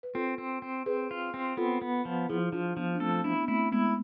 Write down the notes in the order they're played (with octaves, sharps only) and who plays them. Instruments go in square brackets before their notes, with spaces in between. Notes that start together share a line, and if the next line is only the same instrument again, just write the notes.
[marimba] B4
[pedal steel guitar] C4 [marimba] F4 A4
[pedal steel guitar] C4
C4
[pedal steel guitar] C4 [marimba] G#4 B4
[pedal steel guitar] F4
C4
[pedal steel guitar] B3 [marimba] F4 A4
[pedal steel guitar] B3
F3
[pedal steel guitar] F3 [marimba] E4 G#4
[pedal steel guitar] F3 [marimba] D4 F4
[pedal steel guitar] F3 [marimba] B3 D4
[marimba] D4
[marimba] A3 C4 [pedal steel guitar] A4
[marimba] B3 D4 [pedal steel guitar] E4
[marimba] B3
[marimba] A3 C4 [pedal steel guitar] E4
[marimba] G#3 B3 [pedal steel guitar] E4